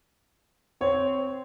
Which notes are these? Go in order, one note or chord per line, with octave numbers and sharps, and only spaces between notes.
C4 C#5